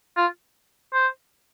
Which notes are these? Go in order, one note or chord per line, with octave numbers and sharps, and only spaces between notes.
F4
C5